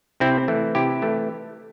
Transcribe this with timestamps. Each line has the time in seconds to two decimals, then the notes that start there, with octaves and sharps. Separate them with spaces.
0.20 C3 C4 E4
0.48 E3 A3
0.75 C3 E4 G4
1.02 E3 A3